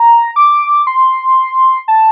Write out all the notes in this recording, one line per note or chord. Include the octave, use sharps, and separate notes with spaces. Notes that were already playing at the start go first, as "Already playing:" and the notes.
Already playing: A#5
D6
C6
A5